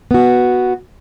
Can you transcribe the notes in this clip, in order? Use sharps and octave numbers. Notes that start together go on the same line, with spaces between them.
B3 F#4